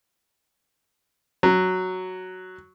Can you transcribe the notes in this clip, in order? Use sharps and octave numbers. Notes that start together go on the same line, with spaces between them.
F#3